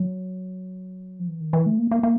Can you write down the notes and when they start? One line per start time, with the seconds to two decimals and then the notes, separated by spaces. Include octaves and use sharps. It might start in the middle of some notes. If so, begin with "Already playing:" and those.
Already playing: F#3
1.19 F3
1.28 E3
1.40 D#3
1.53 E3
1.66 A3
1.79 A#3
1.91 A#3
2.03 A#3